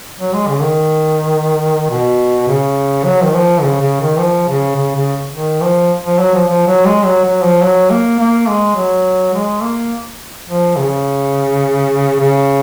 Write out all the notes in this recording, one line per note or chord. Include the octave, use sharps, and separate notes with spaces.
F#3
G#3
C#3
D#3
B2
C#3
F#3
D#3
F3
C#3
C#3
D#3
F3
C#3
C#3
C#3
D#3
F3
F3
F#3
F3
F3
F#3
G#3
F#3
F#3
F3
F#3
A#3
A#3
G#3
F#3
G#3
A#3
F3
C#3
C#3